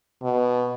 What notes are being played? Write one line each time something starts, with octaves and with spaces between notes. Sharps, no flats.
B2